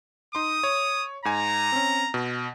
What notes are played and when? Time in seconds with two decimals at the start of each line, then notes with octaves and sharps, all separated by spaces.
0.35 D#4 C6 D#6
0.63 C#5
1.25 G#2 G#5 A#5
1.72 C4 C#4
2.14 B2